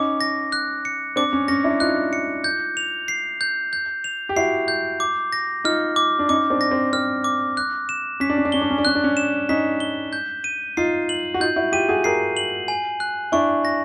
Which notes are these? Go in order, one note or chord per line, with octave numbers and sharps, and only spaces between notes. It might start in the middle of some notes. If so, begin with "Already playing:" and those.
Already playing: C#4 D#4 D6
A#6
F#6
C#7
C4 D4 D6
C#4
C#4 A#6
D4 E4
D#4 F4 F#6
C#7
G6
F7
C7
G6
G6
F7
G4
E4 F#4 C7
G6
D6
A#6
D#4 F4 F6
D6
D4
C#4 D#4 D6
C4 D4
A#6
C4
C4 F6
D6
F#6
E7
C#4 B6
D4
C#4
D4
C#4 G7
D4
C#4
D4
C#4 F#6
D4
C#4
E7
C#4 D#4 B6
G7
G6
D#7
D#4 F4 C7
F#7
F#4
D#4 F4 G6
E4 F#4
F4 G4 D#7
F#4 G#4
G#4 A#4 C7
F#7
G#5
F#6
D4 E4 C#6
A#6